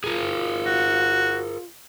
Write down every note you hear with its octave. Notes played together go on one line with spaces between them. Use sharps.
F4 G#4 A#4
F#4